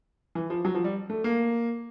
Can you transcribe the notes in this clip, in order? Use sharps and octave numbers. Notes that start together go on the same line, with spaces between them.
E3
F3
F#3
F3
G3
A3
A#3